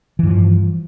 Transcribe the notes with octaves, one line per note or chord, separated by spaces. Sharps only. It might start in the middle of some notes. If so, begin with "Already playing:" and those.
G2 E3 F3